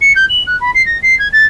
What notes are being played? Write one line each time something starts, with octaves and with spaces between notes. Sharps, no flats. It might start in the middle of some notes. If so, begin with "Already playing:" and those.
C#7
G6
F#7
F#6
B5
C7
A#6
C7
G#6
A6